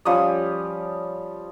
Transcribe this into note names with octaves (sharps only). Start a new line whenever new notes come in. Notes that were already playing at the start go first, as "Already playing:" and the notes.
F3 G3 C#4 D#6